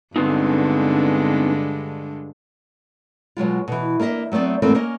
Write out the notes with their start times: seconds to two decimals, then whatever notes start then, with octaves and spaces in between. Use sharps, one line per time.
0.16 G2 D3 G#3 B3 C4 D#4
3.37 B2 F#3 G#3 F4
3.68 B2 E3
4.00 A#3 D4 A4 D#5 E5
4.32 F#3 A3 B3 C4 D5
4.62 E2 G#2 E3 A3 A#3 C4
4.75 A#3 C#4 D#5